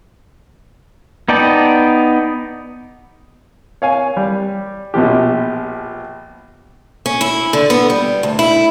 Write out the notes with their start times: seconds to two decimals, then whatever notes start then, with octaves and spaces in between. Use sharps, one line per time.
1.29 B3 D#4 D5 G5 A5
3.82 C#5 F5 G#5
4.17 G3
4.94 A#1 B2 F3 G4
7.06 C#4
7.21 E4
7.53 D3
7.70 B3
7.90 G3
8.23 D2
8.39 E4